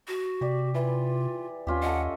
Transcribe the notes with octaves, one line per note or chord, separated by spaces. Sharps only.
F#4
C3 G4 D5
E3 F4
D#2 C#4 F4 G4
A4 D#5 F#5